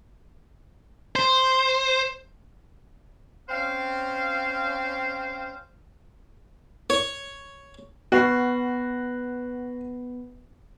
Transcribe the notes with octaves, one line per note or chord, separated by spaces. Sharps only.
C5
C4 C#4 C5 F5
C#5
B3 F#4 B4 C7